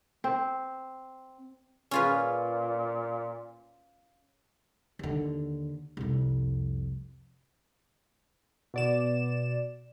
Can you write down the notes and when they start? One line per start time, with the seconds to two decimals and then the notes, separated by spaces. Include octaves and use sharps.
0.24 C4
1.91 A#2 C#4 F4 B4
4.99 D#2 D3
5.97 C2 F2
8.74 B2 D5 E7